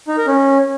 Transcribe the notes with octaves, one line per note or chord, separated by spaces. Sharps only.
D#4
A#4
C#4